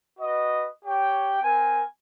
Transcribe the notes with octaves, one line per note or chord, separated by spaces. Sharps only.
F#4 B4 D#5
G4 C#5 G5
C4 A#4 G#5